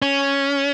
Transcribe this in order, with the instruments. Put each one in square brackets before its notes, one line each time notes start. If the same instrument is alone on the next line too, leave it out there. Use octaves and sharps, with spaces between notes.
[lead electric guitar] C#4